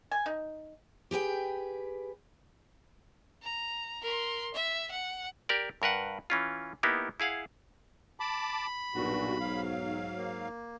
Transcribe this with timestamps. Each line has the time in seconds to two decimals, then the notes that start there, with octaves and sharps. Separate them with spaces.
0.11 G#5
0.26 D#4
1.11 G4 G#4 B4 G5
3.42 A#5
4.01 A#4 C6
4.54 E5
4.91 F#5
5.49 G4 A#4 D5
5.82 G2 A#4 B4 F#5
6.30 E3 C#4 F4
6.83 A#3 B3 D#4 E4 G4
7.20 E4 G#4 F5 F#5
8.20 A5 B5 D6
8.95 B1 G2 A#2 F#4
9.40 G#2 F#3 F5
10.17 A#3